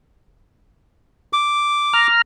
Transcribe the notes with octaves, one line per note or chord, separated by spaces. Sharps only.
D6
A#5 F6